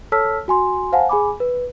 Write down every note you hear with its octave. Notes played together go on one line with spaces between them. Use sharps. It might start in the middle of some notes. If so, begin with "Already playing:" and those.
A4 C#5 A5 E6 F6 B6
F#4 G#5 C6
C5 F5 F#5 G#5 A5
G#4 G#5 B5 D6
B4